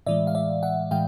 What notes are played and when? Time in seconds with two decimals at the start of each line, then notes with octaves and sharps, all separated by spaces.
0.06 A2 E3 G#3 D5 E5
0.27 F5
0.35 D5 E5
0.63 E5 F#5
0.91 A2 E3 G#3 F5 G5